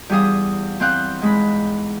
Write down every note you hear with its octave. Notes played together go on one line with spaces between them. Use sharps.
E2 G3 G#4 F5 D#6
E2 C4 F5 F#6 G6
G#2 G#3 B5